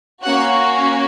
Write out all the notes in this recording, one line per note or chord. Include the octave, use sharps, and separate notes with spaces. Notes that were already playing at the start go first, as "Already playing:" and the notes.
A#3 C#4 F#4 F#5